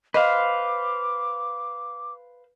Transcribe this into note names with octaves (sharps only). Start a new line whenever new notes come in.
B4 C5 D#5 F5 D6